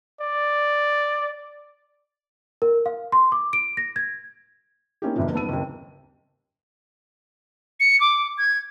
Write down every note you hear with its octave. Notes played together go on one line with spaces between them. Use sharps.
D5
A#4
F5
C6
D6
D7
A#6
G#6
A#3 C4 C#4 D#4 E4 G4
F#1 E2 G2 A#2 E3 F3
D#1 B3 D#4 A5 E6 D#7
F#1 D#2
C#7
D6
G#6